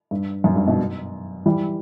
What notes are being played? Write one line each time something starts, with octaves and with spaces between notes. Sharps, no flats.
G2
F#2
G2
G2 B2
E3 G3